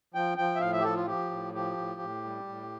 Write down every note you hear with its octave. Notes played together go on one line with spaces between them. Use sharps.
F3 G5
F3 G5
E5
A2 F5
E5
G4
F3 A4
F4
F3 G4
A2
F3 G4
A2
A2
G3
A2